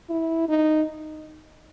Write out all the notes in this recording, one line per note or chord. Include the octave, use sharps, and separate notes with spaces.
E4
D#4